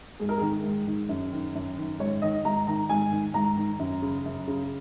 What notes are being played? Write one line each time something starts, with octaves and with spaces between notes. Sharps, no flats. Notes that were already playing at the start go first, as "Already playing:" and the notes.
G#2 G#4
A#4
D#3 G#4
G#2
D#3
F#2
D#3
F#2
D#3
G#2 C#5
D#3 D#5
G#2 A#5
D#3 A#5
G#2 G#5
D#3
G#2 A#5
D#3
F#2
C#3
F#2
C#3